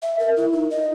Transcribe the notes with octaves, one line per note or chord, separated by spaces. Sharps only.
E5
A#4
E4
D#4
D#5